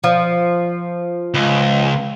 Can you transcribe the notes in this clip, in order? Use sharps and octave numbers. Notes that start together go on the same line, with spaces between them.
F3
C#2